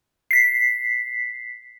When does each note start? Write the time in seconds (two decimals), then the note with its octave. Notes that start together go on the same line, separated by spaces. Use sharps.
0.31 B6 C7